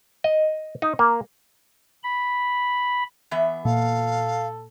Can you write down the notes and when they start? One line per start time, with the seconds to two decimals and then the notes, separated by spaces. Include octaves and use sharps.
0.24 D#5
0.82 D#4
0.99 A#3
2.03 B5
3.31 E3 B3 E5
3.65 A#2 A4 F5